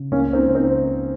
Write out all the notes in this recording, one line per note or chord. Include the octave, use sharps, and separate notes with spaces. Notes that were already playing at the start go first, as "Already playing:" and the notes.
Already playing: C#3
C#2 A#3 C#4
C4 D#4
C#2
C4 D#4